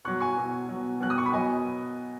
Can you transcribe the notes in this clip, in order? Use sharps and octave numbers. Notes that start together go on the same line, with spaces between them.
B2 F#3 C#6 F#6
G#5 C#6
B2 F#3
B2 F#3
B2 F#3 F#6
D#6
C#6
B5
B2 F#3 D#5 G#5